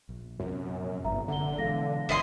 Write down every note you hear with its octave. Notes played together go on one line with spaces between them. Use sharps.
A#1
A#1 F#2 C3 F3
G1 E5 A#5
D3 E5 F#5 G7
B2 E3 G#3 A4 F5 A#6
G1 E4 D#5 C6